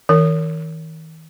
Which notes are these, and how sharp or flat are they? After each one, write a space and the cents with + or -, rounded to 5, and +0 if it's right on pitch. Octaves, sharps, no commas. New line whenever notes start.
D#3 +45 A#4 -25